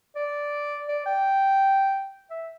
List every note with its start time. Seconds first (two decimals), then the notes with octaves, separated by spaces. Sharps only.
0.16 D5
0.88 D5
1.06 G5
2.30 E5